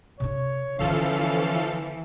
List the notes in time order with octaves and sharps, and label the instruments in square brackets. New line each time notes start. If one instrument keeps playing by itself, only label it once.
[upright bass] C3 D4 [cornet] C#5
[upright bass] D3 B3 [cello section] E3 [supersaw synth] F3 A4 F5 [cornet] C#4